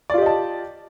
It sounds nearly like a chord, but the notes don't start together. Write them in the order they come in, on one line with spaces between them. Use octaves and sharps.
D5 F4 G4 D#5 A5